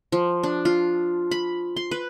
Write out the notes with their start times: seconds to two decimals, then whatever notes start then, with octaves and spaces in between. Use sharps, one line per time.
0.12 F3
0.43 D4
0.65 F4
1.31 B5
1.77 C6
1.91 B4